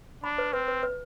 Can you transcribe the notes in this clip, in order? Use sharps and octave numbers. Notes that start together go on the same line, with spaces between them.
D4 B5
B4
C4 B4
B4
B4